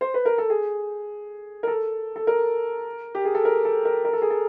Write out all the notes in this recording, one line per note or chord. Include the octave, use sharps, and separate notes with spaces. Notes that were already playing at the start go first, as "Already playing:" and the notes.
C5
B4
A#4
A4
G#4
A#4
A4
A4
A#4
G4
G#4
A4
A#4
A4
A#4
A#4
A4
G#4
A4